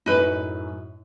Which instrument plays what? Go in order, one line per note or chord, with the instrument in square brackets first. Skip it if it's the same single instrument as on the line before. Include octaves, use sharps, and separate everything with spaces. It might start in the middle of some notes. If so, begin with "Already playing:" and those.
[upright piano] F#2 A2 [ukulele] D#4 B4